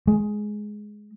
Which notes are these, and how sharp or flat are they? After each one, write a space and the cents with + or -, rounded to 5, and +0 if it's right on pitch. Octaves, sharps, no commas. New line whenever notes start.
G#3 +10